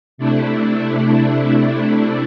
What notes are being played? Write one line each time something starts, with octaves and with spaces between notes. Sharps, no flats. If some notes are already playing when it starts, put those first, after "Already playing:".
C3 A3 D4 E4